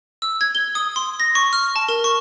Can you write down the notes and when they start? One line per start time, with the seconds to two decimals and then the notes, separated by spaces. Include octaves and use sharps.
0.22 E6
0.41 G#6
0.55 G7
0.75 D#6
0.96 C6
1.20 A#6
1.35 C#6
1.53 F6
1.76 A5
1.89 A#4
2.04 C#6